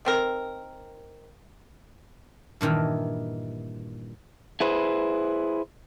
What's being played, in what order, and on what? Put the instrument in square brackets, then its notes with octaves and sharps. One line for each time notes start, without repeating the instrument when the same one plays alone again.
[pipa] D#3 C4 A#4
[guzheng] G2 A#2 D#3 E3
[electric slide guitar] E4 G#4 B4 C5